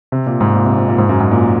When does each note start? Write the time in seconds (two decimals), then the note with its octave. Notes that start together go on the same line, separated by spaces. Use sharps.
0.12 C3
0.26 A#2
0.40 G#2
0.55 A#2
0.65 C3
0.77 A#2
0.88 A#2
0.98 G#2
1.09 F#2
1.20 G#2
1.31 A#2